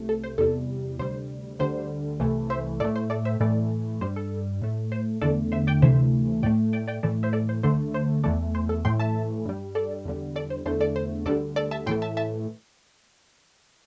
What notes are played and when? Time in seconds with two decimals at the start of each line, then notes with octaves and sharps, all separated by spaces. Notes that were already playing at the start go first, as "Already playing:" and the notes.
Already playing: C2 C3 A3
0.09 A4
0.24 C5
0.38 E2 C3 G3 A4
0.99 D2 C3 G3 C5
1.59 D2 D3 G3 C5
2.20 C2 C3 E3 A3
2.50 C5 E5
2.80 A2 A3 A4 D5
2.96 C5
3.10 A4 D5
3.25 C5 E5
3.40 A2 E3 A3 A4 D5
4.01 G2 G3 C5
4.16 A4
4.62 A2 A3
4.92 C5
5.21 E2 D3 A3 A4 D5
5.52 C5 E5
5.67 D5 G5
5.82 D2 C3 E3 A3 C5 E5
6.43 A2 A3 D5 G5
6.73 D5 G5
6.88 D5 G5
7.03 A2 E3 A3 A4 D5
7.23 C5 E5
7.33 A4 D5
7.49 C5
7.63 D2 D3 A3 C5
7.94 C5
8.24 E2 E3 A3 A4 D5
8.55 C5
8.69 A4
8.85 A2 E3 A3 G5 C6
9.00 E5 A5
9.45 G2 G3
9.75 A4 D5
10.05 E2 D3 G3
10.36 A4 D5
10.50 C5
10.66 E2 D3 A3 C5
10.80 A4 D5
10.96 C5
11.26 D2 D3 G3 A4 D5
11.56 A4 D5
11.71 E5 A5
11.86 A2 E3 A3 G5 C6
12.02 E5 A5
12.17 E5 A5